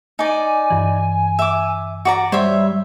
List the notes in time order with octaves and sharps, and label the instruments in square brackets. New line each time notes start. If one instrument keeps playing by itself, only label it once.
[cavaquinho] D#4 D5 [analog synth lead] G#5
[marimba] G2 E3
[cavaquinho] E5 D6
F#4 D5 A#5
[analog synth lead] G3 [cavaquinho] C5 C#5 E5